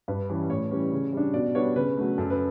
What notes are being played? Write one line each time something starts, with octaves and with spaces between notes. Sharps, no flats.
G2 B4
E3 G3 C#4
A2 C#5
E3 G3 C#4
C#3
G3 D4
B2 D5
G3 B3 D4 C#5
C#3 B4
F#3 A3
F#2 A4
B4